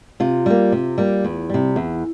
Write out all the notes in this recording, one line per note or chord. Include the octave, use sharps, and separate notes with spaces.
C3 F4
G3 A#3
C3
G3 A#3
E2
C3 G3
E2